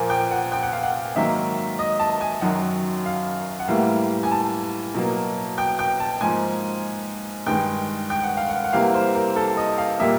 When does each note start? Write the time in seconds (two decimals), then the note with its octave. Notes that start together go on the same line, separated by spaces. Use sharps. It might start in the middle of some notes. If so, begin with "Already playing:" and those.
Already playing: A#2 F3 A#3 G#5
0.10 G5
0.31 F#5
0.52 G5
0.63 F#5
0.73 F5
0.83 F#5
1.15 G#2 D#3 F#3 A#3 E5
1.79 D#5
2.00 A5
2.21 G#5
2.41 F#2 D#3 F#3 F#5
3.06 F5
3.59 F#5
3.68 A2 E3 G3 A#3 F5
4.23 G#5
4.31 A5
4.94 B2 F#3 A#3
5.58 G5
5.79 G5
6.00 A5
6.21 G#2 F3 A#3 G#5
7.47 G2 D#3 G#3 G5
8.10 G5
8.23 F#5
8.37 F5
8.49 F#5
8.64 F#5
8.73 C3 E3 G3 A#3 F5
8.94 C5
9.15 A#4
9.36 A4
9.57 D#5
9.78 F5
9.99 A#2 G3 A#3 E5